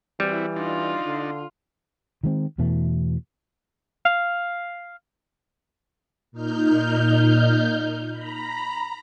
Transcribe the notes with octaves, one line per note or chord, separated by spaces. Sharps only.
E3 G3 C4 E4 F#4
D4 D#4 F4
D3
D#3 G#3 C4
E2 B2 E3 A3
F5
A#2 D#4 F6 G6
A#5 B5